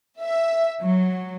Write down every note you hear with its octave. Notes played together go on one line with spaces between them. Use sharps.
E5
F#3